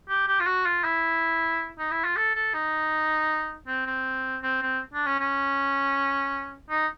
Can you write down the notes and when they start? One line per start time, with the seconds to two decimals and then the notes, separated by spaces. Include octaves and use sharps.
0.09 G4
0.27 G4
0.40 F4
0.46 F#4
0.65 F4
0.84 E4
1.79 D#4
1.91 E4
2.04 F4
2.16 A4
2.35 A4
2.54 D#4
3.67 C4
3.87 C4
4.43 C4
4.62 C4
4.94 D4
5.06 C#4
5.19 C#4
6.70 D#4